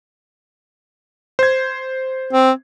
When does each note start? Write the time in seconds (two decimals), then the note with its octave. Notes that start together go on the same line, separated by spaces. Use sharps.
1.39 C5 G#6
2.33 C4